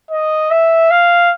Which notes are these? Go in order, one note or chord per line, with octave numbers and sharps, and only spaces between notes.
D#5
E5
F5